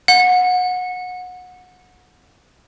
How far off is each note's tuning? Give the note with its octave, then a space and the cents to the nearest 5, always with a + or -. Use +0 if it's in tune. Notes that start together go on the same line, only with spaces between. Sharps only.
F#5 -25